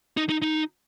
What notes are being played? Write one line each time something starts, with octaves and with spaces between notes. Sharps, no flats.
D#4
D#4
D#4